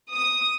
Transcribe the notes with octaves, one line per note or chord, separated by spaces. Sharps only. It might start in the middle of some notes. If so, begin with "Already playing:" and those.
D#6